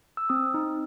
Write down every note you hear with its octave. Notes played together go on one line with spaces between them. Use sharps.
E6
C4 D#6
D#4